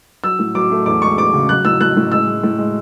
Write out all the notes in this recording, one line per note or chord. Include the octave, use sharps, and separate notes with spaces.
F#3 E6
A2
F#3 D6
A3
E2 D6
G#3 C#6
E2 D6
C#3
F#3 F#6
A2 E6
A2 F#6
A2
G#3 E6
G#3
A2
G#3